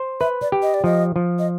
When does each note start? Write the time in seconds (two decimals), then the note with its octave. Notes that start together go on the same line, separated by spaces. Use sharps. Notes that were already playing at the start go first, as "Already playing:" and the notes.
Already playing: C5
0.20 B4 E5
0.42 D5
0.52 G4
0.63 D#5
0.74 D5
0.84 F3 D#5
1.16 F3
1.39 D#5